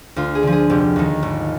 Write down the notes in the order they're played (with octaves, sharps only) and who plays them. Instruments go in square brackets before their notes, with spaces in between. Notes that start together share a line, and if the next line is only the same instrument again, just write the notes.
[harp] D2 F4
G#4
D3 F3
G#4
F1 G4
D#2 D#3
G#1